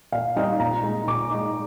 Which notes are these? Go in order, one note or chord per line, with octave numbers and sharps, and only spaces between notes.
A#2 F5
G3 C4 D#4 F5
A#2 A#5
G#3 D#4
A#2 D6
G#3 D#4